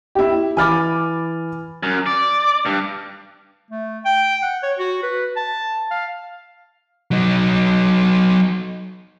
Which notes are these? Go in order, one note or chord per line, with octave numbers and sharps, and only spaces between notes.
E4 G4
E3 G#5 B5 D6 F6 A6
F#2
D5
G2
A3
G5
F#5
C#5
F#4
B4
A5
F5
F#3 D#4